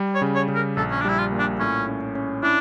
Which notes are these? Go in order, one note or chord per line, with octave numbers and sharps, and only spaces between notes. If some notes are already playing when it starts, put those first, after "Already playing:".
Already playing: G3
C#5
C#3
C#5
C#3
A#4
A#1 A4
C#4
D4
G3 E4
F4
A#2
D4
A2 C#4
C#4
C#4
D4 E4